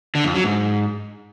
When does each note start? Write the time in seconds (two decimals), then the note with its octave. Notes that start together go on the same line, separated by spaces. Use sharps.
0.15 D3
0.25 F2
0.34 F#3
0.44 G#2